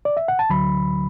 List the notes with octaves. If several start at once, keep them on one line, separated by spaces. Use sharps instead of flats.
D5
E5
F#5
A5
D2 D3 F#3 B5